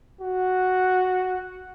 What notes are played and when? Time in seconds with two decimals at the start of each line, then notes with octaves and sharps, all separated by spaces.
0.21 F#4